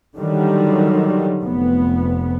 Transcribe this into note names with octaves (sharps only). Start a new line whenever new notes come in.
D3 D#3 F#3 G3
F1 B3